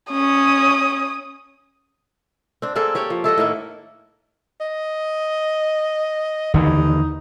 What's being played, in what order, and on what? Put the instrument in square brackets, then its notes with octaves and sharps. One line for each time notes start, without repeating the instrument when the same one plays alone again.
[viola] C#4 [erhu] D#6
[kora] C4 D4
A#3 C4 G#4 A4
G4 C#5 D5 G5
F3
E4 A4 D#5 F#5
A2 D#3 A#3 E4
[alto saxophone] D#5
[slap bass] D#2 D3 E3 [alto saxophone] D#4